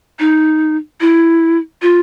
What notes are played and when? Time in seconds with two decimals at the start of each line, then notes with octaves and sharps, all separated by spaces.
0.19 D#4
1.01 E4
1.82 F4